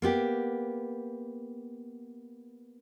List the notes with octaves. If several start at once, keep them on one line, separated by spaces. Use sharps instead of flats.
A#3 B3 G4